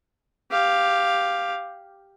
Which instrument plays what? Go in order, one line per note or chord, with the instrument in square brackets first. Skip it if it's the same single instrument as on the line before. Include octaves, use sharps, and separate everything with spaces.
[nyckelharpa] G4 F5